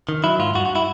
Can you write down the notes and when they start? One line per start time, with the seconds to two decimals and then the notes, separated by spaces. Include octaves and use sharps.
0.09 D#3
0.24 F#3 E4
0.39 G#2 F4
0.55 G2 F#4
0.66 F#4
0.75 E4